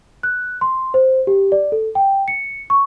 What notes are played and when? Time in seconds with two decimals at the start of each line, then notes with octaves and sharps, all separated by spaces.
0.23 F#6
0.61 C6
0.94 C5
1.27 G4
1.52 D5
1.72 A4
1.95 G5
2.28 C#7
2.70 C#6